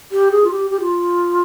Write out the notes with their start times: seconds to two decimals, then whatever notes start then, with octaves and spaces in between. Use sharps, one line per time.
0.12 G4
0.32 G#4
0.44 F4
0.51 G4
0.70 G4
0.81 F4